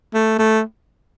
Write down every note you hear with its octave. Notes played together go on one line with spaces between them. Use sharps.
A3
A3